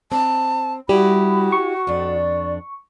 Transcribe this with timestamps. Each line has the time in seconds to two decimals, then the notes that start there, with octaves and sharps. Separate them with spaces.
0.12 C4 A5
0.89 G3 E4 F#4 G4 B5 D#6
1.52 C#6
1.87 F2 D4 D5